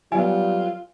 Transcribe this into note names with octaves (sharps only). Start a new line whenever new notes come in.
F#3 G3 B3 F4 G#5